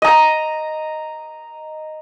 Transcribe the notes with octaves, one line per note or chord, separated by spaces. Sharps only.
D#5 A#5